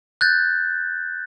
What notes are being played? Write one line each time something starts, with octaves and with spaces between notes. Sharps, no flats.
F#6 G6 A6